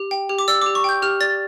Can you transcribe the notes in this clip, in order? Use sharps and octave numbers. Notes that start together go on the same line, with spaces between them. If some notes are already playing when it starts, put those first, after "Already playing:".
Already playing: G4
G5
G4
D6
D5 E6
D6
G4
C#6
G5 G6
G4 F6
D5 A6